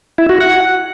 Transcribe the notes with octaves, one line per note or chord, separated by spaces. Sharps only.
E4
F#4
F#5